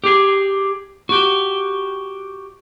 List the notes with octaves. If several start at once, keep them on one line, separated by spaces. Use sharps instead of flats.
G4 G#4
F#4 G4